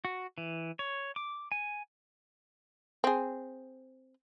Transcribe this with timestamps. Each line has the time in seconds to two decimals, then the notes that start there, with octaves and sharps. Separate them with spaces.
0.05 F#4
0.38 E3
0.79 C#5
1.16 D6
1.52 G#5
3.04 C4 G#4